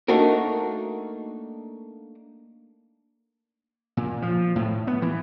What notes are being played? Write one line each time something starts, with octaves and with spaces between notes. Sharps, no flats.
A3 A#3 D4 D#4 F#4 A#4
A#2
F3
A2
B3
E3